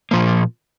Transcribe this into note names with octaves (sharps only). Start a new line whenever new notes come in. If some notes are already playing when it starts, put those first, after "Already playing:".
A#2 F3 A#3